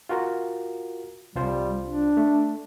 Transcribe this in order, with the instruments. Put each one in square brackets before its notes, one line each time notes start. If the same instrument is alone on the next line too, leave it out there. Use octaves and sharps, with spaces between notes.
[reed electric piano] F4 F#4 A#4
[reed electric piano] C2 F4 C5 [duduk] G3
[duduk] D4
[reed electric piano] A3